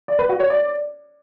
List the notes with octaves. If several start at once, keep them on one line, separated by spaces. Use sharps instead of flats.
D5
B4
F#4
C#5
D5